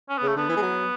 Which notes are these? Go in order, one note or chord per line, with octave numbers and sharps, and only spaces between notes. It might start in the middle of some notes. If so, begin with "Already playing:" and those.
C#4
B3
C#3
A3
D3 B3
E3
G#3
F#3